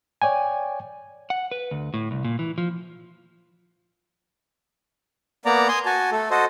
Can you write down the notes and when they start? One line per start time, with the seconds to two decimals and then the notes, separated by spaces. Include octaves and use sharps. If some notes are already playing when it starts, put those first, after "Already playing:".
0.22 C#5 D5 G5 G#5
1.30 F#5
1.52 B4
1.71 D2
1.94 A2
2.11 C2
2.25 A#2
2.39 E3
2.58 F3
5.45 A#3 B3 D5 A#5
5.68 G#5 C6 D#6
5.85 F#4 G#5 A5
6.12 A3 A4
6.30 F#4 A4 C5 D#5